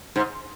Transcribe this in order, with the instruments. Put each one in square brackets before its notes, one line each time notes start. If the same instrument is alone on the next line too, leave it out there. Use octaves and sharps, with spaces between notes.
[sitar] G#2